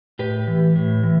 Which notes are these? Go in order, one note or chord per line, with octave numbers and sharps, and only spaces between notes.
A2 G4 B4
E3
A2
E3